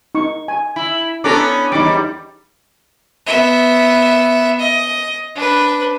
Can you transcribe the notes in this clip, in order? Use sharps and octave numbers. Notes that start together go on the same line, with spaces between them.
D#4 C#6
G#5
E4
B3 C#4 D4 A4 A#5 D6
E2 G3 D#4 D6
B3 E5
D#5
D4 B4